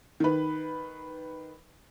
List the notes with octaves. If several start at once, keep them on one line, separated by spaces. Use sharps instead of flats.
D#3 B4